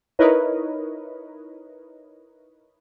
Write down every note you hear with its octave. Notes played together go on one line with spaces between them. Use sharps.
D#4 E4 A#4 B4 C#5 D#5